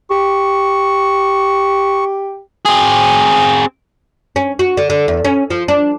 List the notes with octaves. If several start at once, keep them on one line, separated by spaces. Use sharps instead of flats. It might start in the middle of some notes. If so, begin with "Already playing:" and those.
G4 C#6
C4 G#4
C#4
F#4
D3
D3
E2
C#4
F3
D4